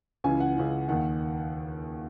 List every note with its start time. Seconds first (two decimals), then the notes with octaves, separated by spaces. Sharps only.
0.24 C#2 C#3 E3 G#5
0.40 F#5
0.56 C#2 C#3 E3
0.89 D#2 D#3 F#5